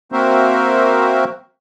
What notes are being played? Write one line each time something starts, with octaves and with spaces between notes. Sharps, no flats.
A#3 C4 F#4 A#4 C5 E5